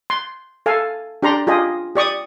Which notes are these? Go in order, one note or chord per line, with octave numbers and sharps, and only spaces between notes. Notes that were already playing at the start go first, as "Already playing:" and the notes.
C6
A4 F5 G#5
D4 G4 D5 A#5 C6
F4 G4 G#4 D#5
G4 D5 C#6 D#6